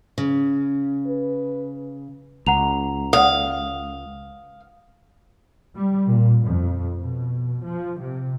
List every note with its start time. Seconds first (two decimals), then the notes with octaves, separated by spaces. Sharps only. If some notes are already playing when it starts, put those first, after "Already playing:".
0.18 C#3
1.07 B4
2.47 C#2 F#5 A#5 F7
3.13 F5 D#6
5.75 G3
6.09 A#2
6.46 F2
6.98 B2
7.62 F3
7.98 C3